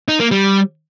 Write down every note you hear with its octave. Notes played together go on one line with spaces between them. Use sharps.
D#4
A#3
G3